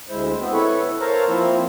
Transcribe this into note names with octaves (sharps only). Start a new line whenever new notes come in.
D2 G#3 E4 C5
B3 C4
E4 A4 B4 C#5
A#4 C5 C#5 F5 A5 A#5
F3 A#3 C4 E4